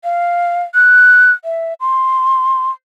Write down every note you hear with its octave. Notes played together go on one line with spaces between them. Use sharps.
F5
F#6
E5
C6